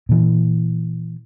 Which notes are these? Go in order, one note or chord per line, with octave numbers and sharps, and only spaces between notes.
A#2 E3